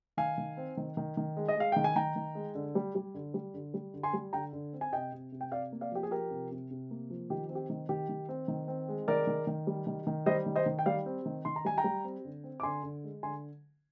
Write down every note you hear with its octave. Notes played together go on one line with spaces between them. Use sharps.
D#3 F5 G#5
D#3
C4
D#3
D#3
D#3
G#3
D#5
G#3 F5
D#3 G5
G#5
D#3 G5 A#5
D#3
G#3
D3
G3
G3
D3
G3
D3
G3
D3
G#5 C6
G3
D3 G5 A#5
D3
C4
G#5
C3 D#5 G5
C3
C3
G5
C3 D5 F5
A#3
D5 F5
F3 G4
G#4
F3 G4 A#4
C3
C3
C3
A#3
F3
D#3 G4
C4
G4
D#3
D#3 G4
D#3
C4
D#3
C4
G#3
D#3 A#4 D5
D#3
D#3
G3
D#3
D#3
G3 C5 D#5
D#3
C5 D#5
D#3
G5
G3 D5 F5
C4
D#3
D#3 C6
A#5
G3 G#5
G5 A#5
G3
C4
D3
C4
D6
D3 G#5 C6
D3
G#3
D3 G#5 C6